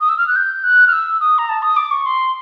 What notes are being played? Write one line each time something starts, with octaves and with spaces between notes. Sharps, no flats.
D#6
E6
F6
F#6
G6
F#6
F6
E6
D#6
A#5
A5
D#6
D6
C#6
C6